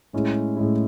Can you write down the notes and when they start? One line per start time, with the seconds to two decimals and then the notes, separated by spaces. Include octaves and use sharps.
0.13 A2 G#3 C#4 E4
0.57 A2 G#3 C#4 E4